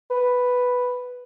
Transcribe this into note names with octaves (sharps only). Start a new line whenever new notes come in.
B4